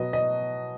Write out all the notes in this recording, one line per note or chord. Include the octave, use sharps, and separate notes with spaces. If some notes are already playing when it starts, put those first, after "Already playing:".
Already playing: B2 F#3 B3 D#5
D#5